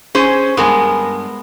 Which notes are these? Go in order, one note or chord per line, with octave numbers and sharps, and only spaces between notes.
C#4 G#4 C5
G2 G#3 B3 A#4